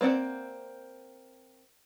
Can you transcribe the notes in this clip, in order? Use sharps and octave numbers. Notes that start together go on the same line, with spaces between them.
A#3 C4 D5 F#5